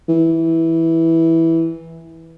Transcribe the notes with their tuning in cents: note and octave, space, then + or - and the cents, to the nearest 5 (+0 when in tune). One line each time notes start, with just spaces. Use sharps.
E3 -10